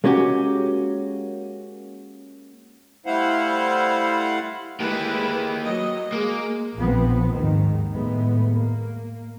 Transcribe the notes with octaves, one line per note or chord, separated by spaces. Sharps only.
G#3 A#3 C#4 F#4 G4
G3 A3 E4 C5 F5 F#5
G#3 A#3 E4 G4 B4
F#3 D#5
G#3 A#3
A#1 F3 B3 C4
D#2 G#2 D#3
A2 G#3 A3 B3
A#3